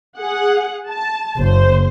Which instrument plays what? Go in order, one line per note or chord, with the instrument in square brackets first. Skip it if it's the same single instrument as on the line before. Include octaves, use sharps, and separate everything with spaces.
[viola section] G#4 F#5
A5
[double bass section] F#1 [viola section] C5